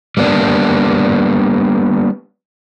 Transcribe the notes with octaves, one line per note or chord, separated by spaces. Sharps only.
G3 A#3 B3 D4